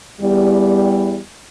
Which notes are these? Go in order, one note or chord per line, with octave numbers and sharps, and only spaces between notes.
E2 G3